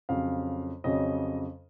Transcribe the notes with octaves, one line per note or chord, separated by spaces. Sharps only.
F2 C#3 F#3 F5
F2 C#3 F#3 D#5